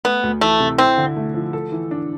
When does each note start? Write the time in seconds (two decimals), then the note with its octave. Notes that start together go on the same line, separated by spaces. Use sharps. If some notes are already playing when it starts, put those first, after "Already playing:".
0.05 A3 B3
0.23 D2
0.41 E3 A3
0.60 C3
0.78 C4 E4
0.97 D3
1.16 A3
1.34 F3
1.53 A4
1.72 E3
1.91 D4